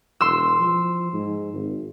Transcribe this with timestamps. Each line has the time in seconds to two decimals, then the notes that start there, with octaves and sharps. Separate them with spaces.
0.21 E1 C6 E6
0.59 F3
1.13 G#2
1.54 G#1